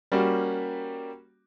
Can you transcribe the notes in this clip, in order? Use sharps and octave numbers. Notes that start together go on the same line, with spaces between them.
G3 A#3 C#4 F#4 G4